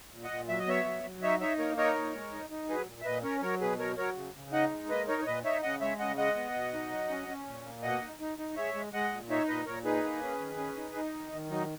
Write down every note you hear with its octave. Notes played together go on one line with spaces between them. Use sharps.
A#2
D#5 F#5
A#2
F#3 E5
D#5
B3 C#5 E5
F#3
F#3
D#4 C#5 E5
D#4 C#5 E5
A#3 A#4 C#5
D#4 A#4 C#5
A#2
G#3
D#4
D#4
F#3 G#4 B4
A#2
E5
A#2 B4 D#5
C#4 A#4 C#5
F#3 A#4 C#5
B2 G#4 B4
F#3 A#4 C#5
F#3 A#4 C#5
C#3
C#3
D#4 D#5 F#5
G#3
A#3 B4 D#5
D#4 A#4 C#5
C#5
A#2 B4 D#5
D#4 C#5 E5
C#3 D#5 F#5
G#3 C#5 E5
C#3 D#5 F#5
G#3 D#5 F#5
B3
B2
D#4
F#3
C#4
C#4
A#2
A#3
B2 D#5 F#5
D#4
D#4
D#4
G#3 C#5 E5
G#3
G#3 D#5 F#5
A#2
D#4 C#5 E5
A#2 B4 D#5
A#2 A#4 C#5
D#4 G#4 B4
A#3
C#4
D#3
C#4
D#4
D#4
D#3
D#3
F#3 D#4